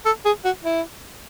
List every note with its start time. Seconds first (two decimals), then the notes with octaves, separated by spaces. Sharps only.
0.05 A4
0.25 G#4
0.45 F#4
0.64 E4